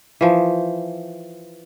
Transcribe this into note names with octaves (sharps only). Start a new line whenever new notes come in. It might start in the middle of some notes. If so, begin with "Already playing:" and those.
E3 F3